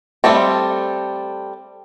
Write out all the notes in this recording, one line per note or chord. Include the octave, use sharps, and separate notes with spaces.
G3 A3 C4 A4